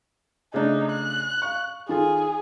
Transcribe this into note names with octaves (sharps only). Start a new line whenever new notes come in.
C#3 A3 D4 D#4
F#6
F5 C#6
D#3 F4 G#4 A4